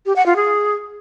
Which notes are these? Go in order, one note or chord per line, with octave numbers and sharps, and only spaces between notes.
G4
F#5
F4
G#4